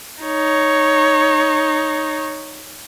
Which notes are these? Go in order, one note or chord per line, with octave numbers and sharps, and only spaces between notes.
D#4 C#5